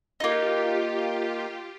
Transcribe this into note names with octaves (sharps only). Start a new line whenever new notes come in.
A#3 D#4 F4 G4